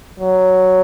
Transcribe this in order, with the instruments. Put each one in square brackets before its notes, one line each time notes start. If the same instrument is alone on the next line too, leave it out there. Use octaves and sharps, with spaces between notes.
[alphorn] F#3